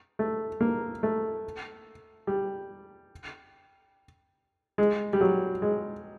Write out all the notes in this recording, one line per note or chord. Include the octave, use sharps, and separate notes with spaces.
A3
A#3
A3
G3
G#3
G3
F#3
G#3